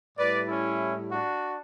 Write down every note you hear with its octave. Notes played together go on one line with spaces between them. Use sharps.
A2 G3 B4 D5
C#4 E4
D4 F#4